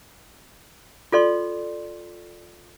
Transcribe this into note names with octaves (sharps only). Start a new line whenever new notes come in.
F4 A4 D5 C6